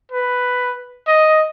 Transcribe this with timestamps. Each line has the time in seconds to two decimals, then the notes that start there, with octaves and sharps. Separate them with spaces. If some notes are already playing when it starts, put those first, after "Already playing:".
0.12 B4
1.07 D#5